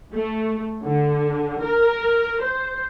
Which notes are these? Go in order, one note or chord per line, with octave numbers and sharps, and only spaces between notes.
A3
D3
A#4
C5